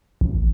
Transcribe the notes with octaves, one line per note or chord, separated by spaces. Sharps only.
A1